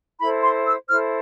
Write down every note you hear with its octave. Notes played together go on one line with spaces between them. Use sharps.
E4 A4 C5 B5
C6
E6
E4 A4 C5 F6